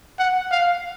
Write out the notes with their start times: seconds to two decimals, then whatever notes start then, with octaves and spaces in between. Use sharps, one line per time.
0.19 F#5
0.51 F5